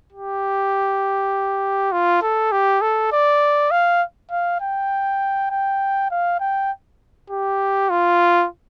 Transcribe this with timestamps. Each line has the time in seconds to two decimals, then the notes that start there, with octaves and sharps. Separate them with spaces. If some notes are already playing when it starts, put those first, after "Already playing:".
0.13 G4
1.92 F4
2.22 A4
2.52 G4
2.82 A4
3.12 D5
3.71 F5
4.31 F5
4.61 G5
5.51 G5
6.11 F5
6.40 G5
7.30 G4
7.90 F4